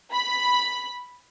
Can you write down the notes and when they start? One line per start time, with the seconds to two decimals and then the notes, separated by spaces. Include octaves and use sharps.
0.13 B5